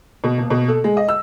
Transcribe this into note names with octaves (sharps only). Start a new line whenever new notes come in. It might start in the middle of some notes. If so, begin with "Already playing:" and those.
B2
D#1
B2
A4
G#3
D#5
E6